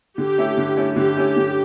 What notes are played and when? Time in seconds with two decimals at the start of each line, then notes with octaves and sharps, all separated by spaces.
0.18 D3 G4
0.38 A3 C#4 E4
0.58 D3
0.77 A3 C#4 E4
0.96 D3 G4
1.17 A3 C#4 E4
1.37 D3